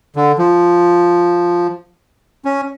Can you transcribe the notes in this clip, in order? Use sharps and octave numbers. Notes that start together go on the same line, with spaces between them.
D3
F3
C#4